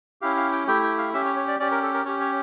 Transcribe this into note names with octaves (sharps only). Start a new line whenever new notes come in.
C#4 E4 G4 F5
F5
G5
A3 E4 G4 G5
G5
F5
C#4 G4 E5
C#5
C#5
D5
C#4 G4 D5
A#4
A4
A#4
C#4 G4 C#5
C#5